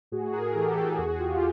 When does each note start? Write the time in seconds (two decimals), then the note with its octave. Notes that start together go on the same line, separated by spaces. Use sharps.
0.12 A2 F#4 G#4
0.33 G#4 A#4
0.55 E3 G4 A4
0.76 F#4 G#4
0.97 E2 F#4 G#4
1.19 F4 G4